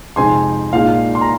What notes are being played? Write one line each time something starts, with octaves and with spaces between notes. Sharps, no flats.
F2 C3 G#3 C4 D#4 G#5 C6
A#1 A#2 G#3 D#4 F5
C6
A#5